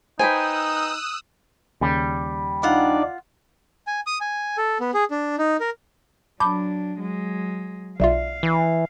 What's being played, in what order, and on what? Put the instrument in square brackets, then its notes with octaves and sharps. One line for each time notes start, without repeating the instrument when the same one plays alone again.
[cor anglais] D#4 [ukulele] B4 C5 [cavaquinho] G5 G#5 [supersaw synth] D#6 E6 F#6
[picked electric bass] D#2 C#3 [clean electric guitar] G3
[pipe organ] D4 D#4 D5 [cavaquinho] F4 F#5
[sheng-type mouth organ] G#5
D#6
G#5
A4
B3
G#4
D4
D#4
A#4
[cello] F#3 D4 [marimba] A5 B5 D6 [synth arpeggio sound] G6
[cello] F#3 G#3
[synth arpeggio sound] B1 F4 [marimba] D5 E5 [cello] F5
[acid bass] E3